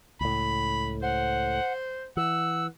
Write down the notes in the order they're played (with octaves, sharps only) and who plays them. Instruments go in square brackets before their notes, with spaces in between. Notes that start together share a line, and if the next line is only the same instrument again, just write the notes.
[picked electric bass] C#2 A2 [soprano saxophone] B5
[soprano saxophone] C5 [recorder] F#5
[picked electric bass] E3 [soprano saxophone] F#5 [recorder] E6